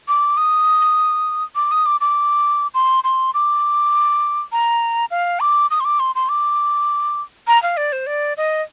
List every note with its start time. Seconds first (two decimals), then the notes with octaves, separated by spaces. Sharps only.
0.08 D6
0.37 D#6
1.55 D6
1.71 D#6
1.86 D6
2.01 D6
2.74 C6
3.04 C6
3.34 D6
4.52 A#5
5.11 F5
5.40 D6
5.71 D#6
5.80 C6
5.85 D6
6.00 C6
6.15 C6
6.29 D6
7.47 A#5
7.63 F5
7.77 D5
7.93 C5
8.07 D5
8.37 D#5